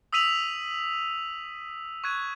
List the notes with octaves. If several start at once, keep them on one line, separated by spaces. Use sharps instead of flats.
D#6 E6 B6 D#7 F7 F#7
C#6 F#6 G#6 D#7